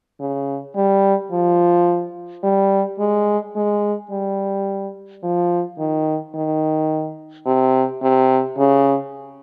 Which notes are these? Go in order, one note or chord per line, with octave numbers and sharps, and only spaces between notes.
C#3
G3
F3
G3
G#3
G#3
G3
F3
D#3
D#3
C3
C3
C#3